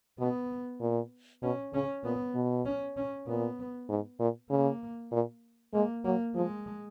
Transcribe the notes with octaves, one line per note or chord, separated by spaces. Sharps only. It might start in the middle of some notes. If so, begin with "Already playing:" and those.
B2 B3
A#2
B2 C#4
C#3 C#4
A#2 B3
B2
C#4
C#4
A#2 B3
G#2
A#2
C#3 A#3
A#2
G#3 A#3
F#3 A#3
F3 G#3